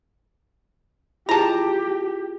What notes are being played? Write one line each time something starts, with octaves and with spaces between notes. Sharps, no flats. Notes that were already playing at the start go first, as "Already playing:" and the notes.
E4 F4 G4 G#4 A5 A#5